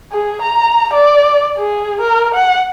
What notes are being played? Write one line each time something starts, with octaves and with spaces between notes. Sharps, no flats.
G#4
A#5
D5
G#4
A#4
F#5